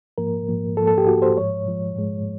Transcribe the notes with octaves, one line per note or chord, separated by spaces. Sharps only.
G#2 F3 A#3 A#4
G#2 F3 A#3
G#2 F3 A#3 A4
A4
G4
G#2 F3 A#3 F#4
C5
G#2 F3 G#3 C#5
G#2 F3 G#3
G#2 F3 G#3